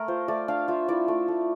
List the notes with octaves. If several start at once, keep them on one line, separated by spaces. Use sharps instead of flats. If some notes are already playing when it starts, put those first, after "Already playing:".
Already playing: A3 A#4
F4 C5
A3 D5
D4 F5
F4 E5
E4 D5
A3
A3